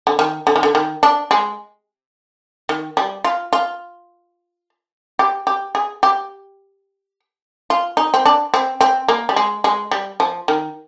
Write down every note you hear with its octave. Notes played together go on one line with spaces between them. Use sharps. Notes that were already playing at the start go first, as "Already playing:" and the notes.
D3
D#3
D3
D#3
D3
D#3
D4
G#3
D#3
G3
F4
F4
G4
G4
G#4
G4
F4
D#4
C4
D4
C4
C4
A#3
G3
G#3
G#3
G3
F3
D#3